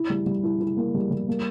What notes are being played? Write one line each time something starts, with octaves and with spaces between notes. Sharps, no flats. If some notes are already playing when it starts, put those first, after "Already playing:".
Already playing: E4
G3
G3
E4
E4
A#3
G3
G3
A#3